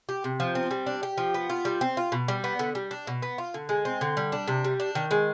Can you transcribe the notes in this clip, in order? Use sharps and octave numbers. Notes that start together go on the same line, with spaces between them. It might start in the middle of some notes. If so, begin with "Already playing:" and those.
G4
C3
F3
C4
G3
D4
G4
F3
B3
F4
G3
C4
F4
B2
G3
B3
D3
G3
D4
B2
B3
F4
D3
G#3
C4
D3
G3
D4
C3
G3
D4
D#3
G#3